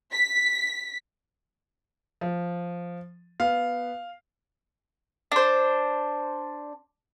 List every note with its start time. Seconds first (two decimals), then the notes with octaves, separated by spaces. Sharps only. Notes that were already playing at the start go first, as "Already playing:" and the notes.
0.12 B6
2.21 F3
3.40 B3 F5
5.32 D4 C5